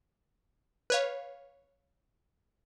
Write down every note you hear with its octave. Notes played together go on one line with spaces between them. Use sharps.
B4 C#5 F5